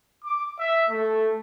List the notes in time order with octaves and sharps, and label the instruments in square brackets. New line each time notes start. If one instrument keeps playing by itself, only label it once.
[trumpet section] D6
E5
A3